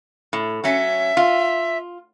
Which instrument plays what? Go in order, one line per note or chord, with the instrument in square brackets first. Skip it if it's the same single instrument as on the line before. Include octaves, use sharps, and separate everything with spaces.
[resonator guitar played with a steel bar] A2
[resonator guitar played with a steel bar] F#3 C#4 [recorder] E5
[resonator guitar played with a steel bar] F4